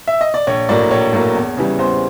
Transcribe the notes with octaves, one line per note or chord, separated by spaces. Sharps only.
E5
D#5
D5
A#1 C#5
A2 F#3 A#3 D5
A#1 C#5
A2 F#3 A#3
E2
C#3 E3 G3
E2 C5